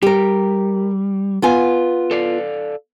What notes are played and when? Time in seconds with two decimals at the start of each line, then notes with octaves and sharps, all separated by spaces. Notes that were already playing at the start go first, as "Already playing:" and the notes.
0.02 G3 G4 A#4
1.42 B3 F4 G#5
2.11 A4 D5 F5